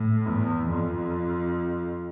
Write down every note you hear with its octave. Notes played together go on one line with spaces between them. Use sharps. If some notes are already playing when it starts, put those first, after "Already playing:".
Already playing: A2
E2
F2